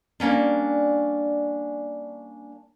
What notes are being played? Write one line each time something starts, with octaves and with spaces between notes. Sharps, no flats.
G3 A#3 C#4 D4